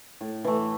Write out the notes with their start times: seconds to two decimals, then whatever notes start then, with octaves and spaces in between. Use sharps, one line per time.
0.21 A2
0.44 E3 A3